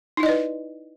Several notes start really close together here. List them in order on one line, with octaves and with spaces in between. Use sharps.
D#4 E4 D#5 D5 B4